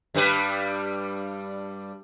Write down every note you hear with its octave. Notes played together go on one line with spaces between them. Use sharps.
G2 G3 B4